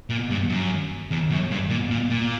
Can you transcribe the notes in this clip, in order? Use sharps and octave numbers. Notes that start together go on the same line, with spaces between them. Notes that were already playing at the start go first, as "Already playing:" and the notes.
A#2
G2
F#2
E2
F#2
G2
A#2
A#2
A#2